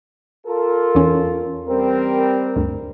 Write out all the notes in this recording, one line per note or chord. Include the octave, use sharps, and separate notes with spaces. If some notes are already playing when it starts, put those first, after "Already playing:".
F4 A4 A#4
E2 C#4
G3 C4 A#4
D2 G2